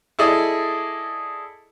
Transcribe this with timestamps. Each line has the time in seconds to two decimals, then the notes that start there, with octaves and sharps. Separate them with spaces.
0.19 E4 G#4 A4 D5 D#5